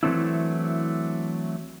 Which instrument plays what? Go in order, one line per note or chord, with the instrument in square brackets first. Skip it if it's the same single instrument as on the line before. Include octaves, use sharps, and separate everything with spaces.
[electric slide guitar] E3 F#3 A3 C4 D4 E4